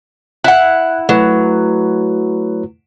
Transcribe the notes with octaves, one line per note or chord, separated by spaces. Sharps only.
E4 F#5 F#6
F#3 A3 E4 B4